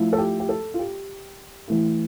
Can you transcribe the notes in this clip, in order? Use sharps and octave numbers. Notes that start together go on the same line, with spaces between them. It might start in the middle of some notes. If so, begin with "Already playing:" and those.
Already playing: F3 A3 E4
A4
G4
G4
A4
F4
G4
E3 A3 E4